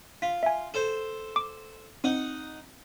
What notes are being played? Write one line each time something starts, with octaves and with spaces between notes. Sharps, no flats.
F4 B6
E5 G#5
A4 C5
D6
C4 D#4 F#5